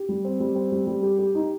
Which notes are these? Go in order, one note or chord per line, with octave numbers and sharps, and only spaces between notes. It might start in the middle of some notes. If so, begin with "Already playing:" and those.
Already playing: G4
G3
C4
G3
C4
G3
G3
G4
G4
D#4